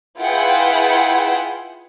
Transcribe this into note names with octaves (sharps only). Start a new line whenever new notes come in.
E4 F4 G#4 B4 F#5 G5